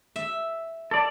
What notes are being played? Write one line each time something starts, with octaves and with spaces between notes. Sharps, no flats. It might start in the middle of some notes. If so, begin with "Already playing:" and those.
E5
A4 D5